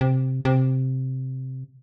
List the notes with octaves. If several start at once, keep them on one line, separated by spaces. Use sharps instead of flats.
C3
C3